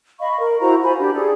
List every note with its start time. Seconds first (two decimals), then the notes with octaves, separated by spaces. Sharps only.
0.19 D#5 F5 B5 C#6
0.39 A#4
0.61 E4 F#4 C5 A#5
0.83 F4 C5 G#5 B5
0.99 D4 G4
1.13 G#4 A4 D5